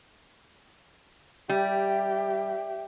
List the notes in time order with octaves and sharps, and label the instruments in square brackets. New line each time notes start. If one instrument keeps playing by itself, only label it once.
[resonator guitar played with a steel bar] G3 [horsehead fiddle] G4 [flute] E5